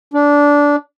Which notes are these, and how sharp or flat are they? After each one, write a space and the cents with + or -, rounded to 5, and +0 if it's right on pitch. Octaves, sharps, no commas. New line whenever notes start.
D4 -15